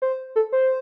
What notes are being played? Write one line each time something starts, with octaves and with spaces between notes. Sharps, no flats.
C5
A4
C5